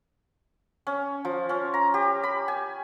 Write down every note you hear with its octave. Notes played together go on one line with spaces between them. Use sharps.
C#4
F3
C#4
A#5
G4
B5
G#5